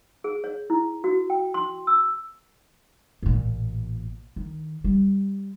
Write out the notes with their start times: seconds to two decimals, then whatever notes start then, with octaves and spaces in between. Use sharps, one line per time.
0.24 G#4
0.44 C#5
0.70 E4
1.04 F#4
1.30 G5
1.54 C6
1.87 E6
3.23 A1 A#2
4.36 D#3
4.84 G3